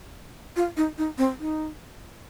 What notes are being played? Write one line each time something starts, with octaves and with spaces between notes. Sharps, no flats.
F4
D#4
D#4
C4
D#4